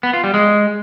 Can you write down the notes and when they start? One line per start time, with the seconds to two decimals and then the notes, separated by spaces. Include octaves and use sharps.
0.03 B3
0.13 F4
0.24 G3
0.34 G#3